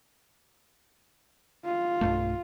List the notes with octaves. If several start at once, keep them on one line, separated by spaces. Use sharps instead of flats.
F4
B1 G2 A3